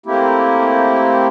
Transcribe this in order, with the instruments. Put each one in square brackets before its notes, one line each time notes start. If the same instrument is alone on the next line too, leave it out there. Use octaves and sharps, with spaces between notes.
[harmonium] A3 A#3 C4 E4 G4